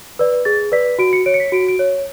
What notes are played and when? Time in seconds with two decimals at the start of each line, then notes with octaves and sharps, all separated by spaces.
0.19 B4 D5
0.45 G#4 A6
0.72 B4 D5 B6
0.99 F#4 D7
1.13 C#7
1.26 C#5 D7
1.34 C#7
1.40 B6
1.52 F#4 D7
1.68 D7
1.79 C#5